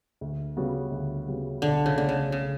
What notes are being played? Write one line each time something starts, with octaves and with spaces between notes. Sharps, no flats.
D2
C#3 G3 B3 F#4
D2
C#3 G3 B3 F#4
B1 D3
C#3
B2 D3 A3 C#4
C#3
C#3